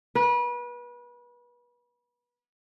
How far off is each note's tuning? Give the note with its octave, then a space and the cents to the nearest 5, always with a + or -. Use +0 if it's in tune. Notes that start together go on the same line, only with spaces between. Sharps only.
B4 -30